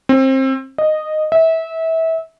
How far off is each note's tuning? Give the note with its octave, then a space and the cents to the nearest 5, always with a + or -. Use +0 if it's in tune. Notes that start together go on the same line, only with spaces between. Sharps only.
C4 +25
D#5 -10
E5 -25